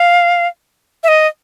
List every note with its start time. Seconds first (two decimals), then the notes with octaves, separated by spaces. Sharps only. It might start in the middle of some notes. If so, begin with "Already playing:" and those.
Already playing: F5
1.03 E5
1.08 D#5